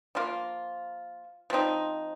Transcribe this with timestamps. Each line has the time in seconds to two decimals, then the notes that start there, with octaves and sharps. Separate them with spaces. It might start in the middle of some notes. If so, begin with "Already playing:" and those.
0.15 F3 A#3 F4
1.50 F3 C4 D#4